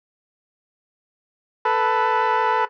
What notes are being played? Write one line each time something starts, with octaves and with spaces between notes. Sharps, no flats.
A4 B4